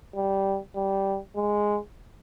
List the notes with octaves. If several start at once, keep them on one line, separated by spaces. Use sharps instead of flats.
G3
G3
G#3